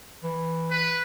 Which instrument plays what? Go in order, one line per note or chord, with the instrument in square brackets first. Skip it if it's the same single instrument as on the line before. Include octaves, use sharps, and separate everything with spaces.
[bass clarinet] E3
[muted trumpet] B4